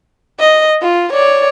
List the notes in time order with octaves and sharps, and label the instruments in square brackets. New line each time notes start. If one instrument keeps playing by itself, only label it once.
[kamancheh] D#5
F4
C#5 D5